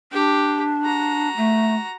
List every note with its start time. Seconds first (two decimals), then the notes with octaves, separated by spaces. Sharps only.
0.12 D4 G4
0.83 F#4 A#5
1.36 A3